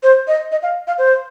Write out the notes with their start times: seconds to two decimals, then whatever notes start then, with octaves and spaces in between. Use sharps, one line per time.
0.03 C5
0.28 D#5
0.52 D#5
0.63 F5
0.88 F5
0.98 C5